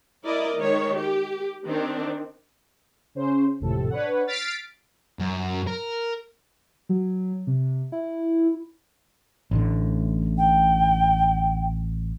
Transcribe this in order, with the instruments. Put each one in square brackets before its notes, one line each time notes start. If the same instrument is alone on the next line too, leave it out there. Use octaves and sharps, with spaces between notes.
[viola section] E4 A#4 D5 D#5
D#3 G#3 C#5
G4
D#3 C4 D4
[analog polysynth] C#3 C#4 C5
G#1 F2 A2 C3 A4
D4 B4 C#5 F#5
F6 A6 B6 C7 D7
[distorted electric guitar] F#2
A#4
[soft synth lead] F#3
C3
E4
[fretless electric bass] A1 A2 D3
[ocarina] G5